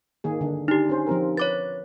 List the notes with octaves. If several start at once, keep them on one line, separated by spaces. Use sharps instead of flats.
D#3 A#3 G#4
D3 D4
D4 D#4 G4
C#4 C5
F3 C4 A#4
B4 C#5 D6 A6